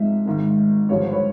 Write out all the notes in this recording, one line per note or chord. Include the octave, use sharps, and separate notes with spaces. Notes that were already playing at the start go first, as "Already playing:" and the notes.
Already playing: G#2 F3 G#3 C4 D#4 E5
G#1 G#2 D#3
G#1 G2 D3 F3 C#5
C5
B4 C#5